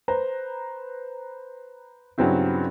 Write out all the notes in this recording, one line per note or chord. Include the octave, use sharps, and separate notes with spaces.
B4 C5 A#5
G2 C#3 F#3 B3 C4 E4